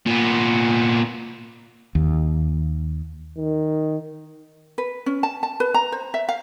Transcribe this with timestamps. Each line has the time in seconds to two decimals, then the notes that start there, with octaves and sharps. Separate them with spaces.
0.06 A#2 B3
1.95 D#2
3.38 D#3
4.78 B4
5.06 C#4
5.23 A5
5.43 A5
5.60 B4
5.74 A#5
5.92 C5
6.14 E5
6.29 F5